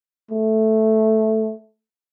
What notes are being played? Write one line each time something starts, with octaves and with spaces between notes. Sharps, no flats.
A3